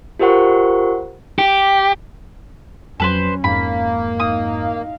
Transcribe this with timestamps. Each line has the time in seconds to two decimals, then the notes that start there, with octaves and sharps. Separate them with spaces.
0.19 F4 G4 A#4 C5 F#5 C#6
1.39 G4
3.00 F2 F#3 C#4 A4 B4 C5
3.44 F2 G#2 A#3 B5
4.20 D#4 F5 D#6